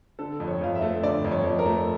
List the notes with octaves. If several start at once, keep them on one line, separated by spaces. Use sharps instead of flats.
D3 A4
F2
C#5
F2 F5
E5
A3
D3 D5
F2
C#5
F2
A#4
A3